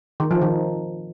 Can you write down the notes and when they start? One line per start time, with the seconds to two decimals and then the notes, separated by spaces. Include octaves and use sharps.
0.20 D#3
0.31 F3
0.41 D#3